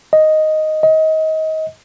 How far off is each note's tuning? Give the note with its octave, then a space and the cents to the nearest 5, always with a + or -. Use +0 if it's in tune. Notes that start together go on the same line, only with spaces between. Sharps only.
D#5 +0
D#5 +25